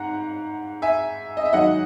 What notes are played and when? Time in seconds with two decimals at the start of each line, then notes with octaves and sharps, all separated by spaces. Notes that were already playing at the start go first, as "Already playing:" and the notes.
Already playing: G#2 F#5 A#5
0.82 E5 G#5
1.37 D#5
1.45 E5
1.53 G#2 D#3 F#3 D#5 F#5